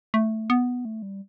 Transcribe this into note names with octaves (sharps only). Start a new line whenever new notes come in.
A3
B3
A3
G3